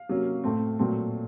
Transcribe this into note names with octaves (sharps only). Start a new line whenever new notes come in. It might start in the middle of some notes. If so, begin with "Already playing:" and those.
Already playing: F5
C3 F#3 A#3 C#4
A2 A3 C4
A#2 F#3 A3 C4